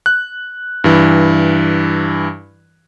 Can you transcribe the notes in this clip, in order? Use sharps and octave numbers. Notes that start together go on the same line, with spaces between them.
F#6
G2 E3